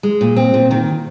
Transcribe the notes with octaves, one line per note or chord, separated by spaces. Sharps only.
G#3
A#2
C4
A#2
D#3